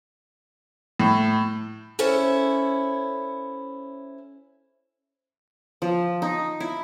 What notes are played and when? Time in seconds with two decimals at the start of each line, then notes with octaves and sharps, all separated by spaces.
1.00 A2
1.99 C#4 E4 A4 C5 C#5
5.82 F3
6.22 D#4
6.60 E4